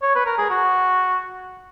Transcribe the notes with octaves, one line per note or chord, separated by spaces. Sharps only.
C#5
B4
A#4
G#4
F#4